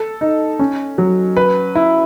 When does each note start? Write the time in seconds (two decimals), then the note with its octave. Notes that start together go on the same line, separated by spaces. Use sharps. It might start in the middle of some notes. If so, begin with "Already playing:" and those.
Already playing: A4
0.21 D#4
0.59 C#4
0.98 F#3
1.37 B4
1.75 E4